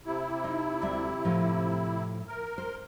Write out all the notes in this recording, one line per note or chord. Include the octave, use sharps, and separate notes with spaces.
C3 E4
D#4
D2 G3 E5
A2 F3
A#4
C5